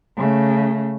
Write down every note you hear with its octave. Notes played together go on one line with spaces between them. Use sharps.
C#3 A3